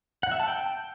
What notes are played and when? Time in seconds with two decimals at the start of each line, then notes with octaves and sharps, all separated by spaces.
0.23 F#5
0.31 E5
0.40 A5
0.48 G5